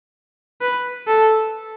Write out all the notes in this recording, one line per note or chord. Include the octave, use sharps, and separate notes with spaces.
B4
A4